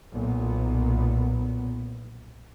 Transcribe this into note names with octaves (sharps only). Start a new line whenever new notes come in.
B1 A#2 B3